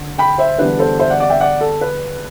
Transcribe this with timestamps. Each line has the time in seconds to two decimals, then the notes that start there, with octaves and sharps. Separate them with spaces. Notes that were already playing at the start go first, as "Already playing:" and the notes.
Already playing: D3
0.18 G5 B5
0.38 C5 E5
0.59 E2 D3 G3 D4 B4
0.79 A4 C5
0.99 C5 E5
1.10 D5 F#5
1.20 D5 F#5
1.30 E5 G5
1.40 D5 F#5
1.61 A4
1.81 B4